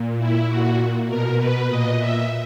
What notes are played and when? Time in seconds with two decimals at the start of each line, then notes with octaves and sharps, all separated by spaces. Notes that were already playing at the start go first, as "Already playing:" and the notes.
Already playing: A#2
0.18 E4
0.48 A#2 F#4
1.08 B2 A#4
1.38 B4
1.67 A#2 D#5
1.98 E5